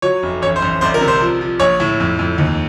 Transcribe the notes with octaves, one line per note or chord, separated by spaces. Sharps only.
F#3 C#5
F1
A1 C#5
C5
A1
C2 C5
A#4
C3
C5
F3
F3
A#1 C#5
A2
F2
F2
D#2